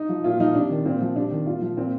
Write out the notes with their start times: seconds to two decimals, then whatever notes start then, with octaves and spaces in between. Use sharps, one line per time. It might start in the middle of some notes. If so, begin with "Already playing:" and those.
Already playing: D#4
0.09 F3
0.24 A#2 F4
0.39 F3 D#4
0.54 C3 D4
0.70 D#3
0.85 A#2 C4
1.01 F3
1.16 C3 D4
1.31 D#3
1.46 A#2 F4
1.62 F3
1.77 A#2 C4